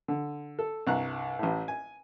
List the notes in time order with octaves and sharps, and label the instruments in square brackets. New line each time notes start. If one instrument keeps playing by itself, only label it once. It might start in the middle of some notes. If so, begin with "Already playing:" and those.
[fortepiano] D3
A4
C2 G2 A#5 F#6
A1 A2
G#5